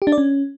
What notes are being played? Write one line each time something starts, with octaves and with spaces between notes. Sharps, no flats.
G4
D4
D5
C#4